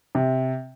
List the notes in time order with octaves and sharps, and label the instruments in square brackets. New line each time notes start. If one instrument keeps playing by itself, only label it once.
[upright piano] C3